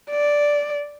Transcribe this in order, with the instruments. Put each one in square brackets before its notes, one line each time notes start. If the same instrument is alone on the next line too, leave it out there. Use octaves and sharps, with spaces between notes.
[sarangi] D5